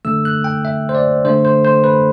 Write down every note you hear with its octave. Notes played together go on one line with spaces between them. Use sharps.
D3 A3 E6
F#6
G5
E5
C5
D5
D3 A3 C5
C5
C5
B4